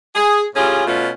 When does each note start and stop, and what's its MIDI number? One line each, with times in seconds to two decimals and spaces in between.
0.15 0.44 68
0.55 0.84 45
0.55 0.84 61
0.55 0.84 65
0.55 0.84 67
0.55 0.84 68
0.87 1.10 47
0.87 1.10 57
0.87 1.10 61
0.87 1.10 65